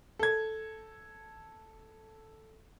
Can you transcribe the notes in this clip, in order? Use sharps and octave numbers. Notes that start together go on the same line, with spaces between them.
A4 G#6